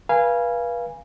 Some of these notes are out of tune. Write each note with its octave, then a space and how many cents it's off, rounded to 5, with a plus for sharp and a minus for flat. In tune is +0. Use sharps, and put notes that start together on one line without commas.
B4 -30 F5 -20 G#5 -10